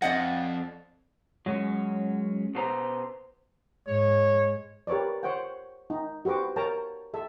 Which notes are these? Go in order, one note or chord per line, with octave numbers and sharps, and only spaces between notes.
F2 D5 D#5 F#5
F#2 F#3 G#3 C#4
B2 C5 A#5
G#2 G#3 C#5
G4 A#4 B4 C#5 D5
C5 C#5 F#5 G5
D#4
F#4 G4 B4 C5 D6
A#4 C#5 G5 A5 A#5
A4 E5